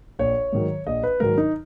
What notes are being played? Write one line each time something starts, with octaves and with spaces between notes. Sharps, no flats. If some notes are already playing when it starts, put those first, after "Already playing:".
A#1 C#5
G#2 D#3 F#3
A#1 D#5
B4
G#2 D#3 F#3 A#4
D#4